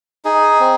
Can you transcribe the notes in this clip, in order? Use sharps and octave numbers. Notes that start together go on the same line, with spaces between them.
D#4 G#4
C4